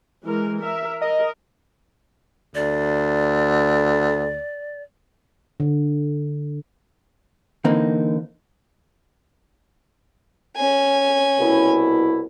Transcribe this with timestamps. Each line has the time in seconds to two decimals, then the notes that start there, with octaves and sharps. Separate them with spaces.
0.23 E3 G#3 A#4
0.60 A#4 E5
1.01 A#4 D#5
2.55 D2 D5
5.60 D3
7.64 D3 E3 A#3 C4 D#4
10.57 C#4 G#5
11.39 C2 B2 E4